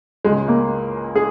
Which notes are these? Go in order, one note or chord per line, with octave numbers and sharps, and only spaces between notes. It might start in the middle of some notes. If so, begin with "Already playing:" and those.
C#2 C#3 G#3
A#3
G#4